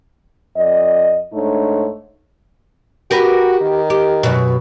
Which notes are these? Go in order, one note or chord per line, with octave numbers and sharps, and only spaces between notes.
F2 D5 D#5
G#2 A3 D4 D#4 C#5
F#4 G4 A#4 B4
D#3
G4
F#2 B2